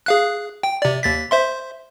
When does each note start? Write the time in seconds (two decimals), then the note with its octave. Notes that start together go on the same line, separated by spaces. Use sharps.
0.06 G#4 F5 F#6
0.63 G5
0.82 C3 D5
1.03 D#2 A6 B6
1.31 C5 E5 C6